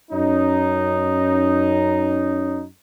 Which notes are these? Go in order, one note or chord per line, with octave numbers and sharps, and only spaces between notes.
F#2 C#4 D#4